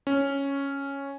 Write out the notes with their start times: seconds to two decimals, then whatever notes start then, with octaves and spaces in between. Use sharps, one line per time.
0.07 C#4